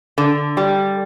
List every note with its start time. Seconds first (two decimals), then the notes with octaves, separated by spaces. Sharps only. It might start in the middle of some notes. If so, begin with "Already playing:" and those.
0.18 D3
0.57 G3